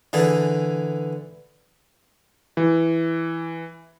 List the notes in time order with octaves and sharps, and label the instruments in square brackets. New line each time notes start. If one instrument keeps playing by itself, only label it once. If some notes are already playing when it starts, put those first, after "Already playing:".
[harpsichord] D3 E3 G#4
[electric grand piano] E3